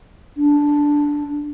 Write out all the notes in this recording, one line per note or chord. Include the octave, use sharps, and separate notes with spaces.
D4